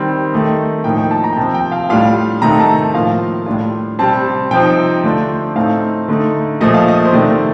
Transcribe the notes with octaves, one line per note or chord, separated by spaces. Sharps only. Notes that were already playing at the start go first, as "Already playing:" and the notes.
Already playing: D#3 G3 C4
D#3 A3 D#4
A2 F3 A#3 D#4 G5
G5
A5
A#5
G5
C3 F3 C4 A5
G5
F5
A2 G3 D4 F4 F5
C3 D#3 A3 D#4 A#5
A5
A5
A2 F3 A#3 F4 F5
A2 G3 D4 F4
C3 G3 C4 A5
C3 F3 C4 D#4 G5
D3 A3 D4 F4
A2 A3 C4 D#4 F5
D3 A3 D#4
A#2 F3 A3 D#5
F5
D#5
C5
C3 D#3 A3 D4 D5